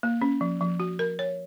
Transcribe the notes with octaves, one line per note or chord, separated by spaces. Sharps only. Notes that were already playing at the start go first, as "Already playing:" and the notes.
A#3
C#4
F3
F3
F#4
A#4
C#5